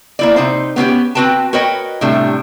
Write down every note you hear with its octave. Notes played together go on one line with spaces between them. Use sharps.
A#3 E4 D5
C3 D#4 C5
B3 C#4 F4 G4
C4 F4 F#4 B4 G5 A5
F#4 A#4 B4 C#5 D#5 G5
A2 C3 G3 A3 D4